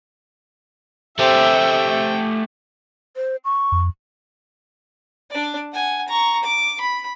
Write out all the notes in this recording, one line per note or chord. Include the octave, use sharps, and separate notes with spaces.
C3 A3 G4 E5 G5 C6
C5
C#6
F2
D4 D5
F#5 G#5
A#5 C#6
D6
B5